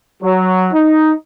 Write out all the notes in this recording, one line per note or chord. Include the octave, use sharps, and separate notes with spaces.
F#3
D#4